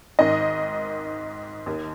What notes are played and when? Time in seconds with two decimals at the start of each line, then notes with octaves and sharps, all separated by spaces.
0.19 G#1 G#2 D#3 D#5
1.66 D#2 D#3